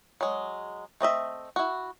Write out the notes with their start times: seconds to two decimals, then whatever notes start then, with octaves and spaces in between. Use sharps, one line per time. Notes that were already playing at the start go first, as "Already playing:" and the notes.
0.21 F#3 G#3
1.01 A3 C4 D#5 E5
1.56 E4 F#4